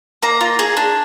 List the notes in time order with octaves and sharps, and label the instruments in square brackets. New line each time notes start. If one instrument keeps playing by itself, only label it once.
[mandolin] A#3 A#5
F4
G#4
D4